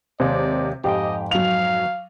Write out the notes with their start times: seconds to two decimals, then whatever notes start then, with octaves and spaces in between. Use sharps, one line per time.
0.20 D#2 C3 G#3 D5
0.84 F2 G#2 G4 D#5 G5
1.31 F#3 F5 F7